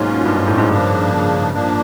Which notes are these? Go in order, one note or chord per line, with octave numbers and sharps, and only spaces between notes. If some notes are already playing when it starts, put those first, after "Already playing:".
Already playing: G#2 B2 F#3 A#3 C#4 F4
G2
G#2
A2
G#2
G2 C#3 F3 A#3 D4
F3 A#3 D4